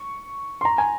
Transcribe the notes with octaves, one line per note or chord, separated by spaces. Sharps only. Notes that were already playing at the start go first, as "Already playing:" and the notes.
Already playing: C#6
C6
A#5
G#5